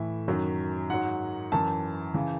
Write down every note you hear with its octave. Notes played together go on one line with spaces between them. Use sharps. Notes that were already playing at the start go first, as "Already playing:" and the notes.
Already playing: A2 E3 E5
F#2 D#3 F#3
G#2 F#3 F#5
F#2 E3 A5
C#3 E3